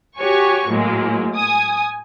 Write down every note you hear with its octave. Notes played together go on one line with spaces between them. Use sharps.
F#4 G4 C#5 G#5 C#6
A2 F#3 G#3 A#3
G#5 D#6